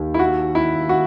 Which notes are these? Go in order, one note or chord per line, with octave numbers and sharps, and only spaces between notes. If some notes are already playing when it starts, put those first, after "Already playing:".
Already playing: D#2
E4
F#4
E4
F#4